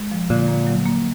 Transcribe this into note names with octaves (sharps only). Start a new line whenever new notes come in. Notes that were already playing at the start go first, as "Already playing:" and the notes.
Already playing: G#3
F3
A#2 D3
A#3
F#3
A#3